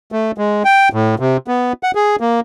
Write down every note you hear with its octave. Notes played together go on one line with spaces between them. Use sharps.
A3
G#3
G5
A2
C3
B3
F#5
G#4
A#3